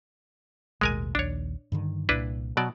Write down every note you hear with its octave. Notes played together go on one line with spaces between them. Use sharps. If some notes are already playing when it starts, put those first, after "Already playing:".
A1 D#2 B2 G#3 A#4 G#5
A#1 D#2 D4 C#5
G2 D3 D#3
C2 A#2 D4 E4 B4
B2 F#3 D5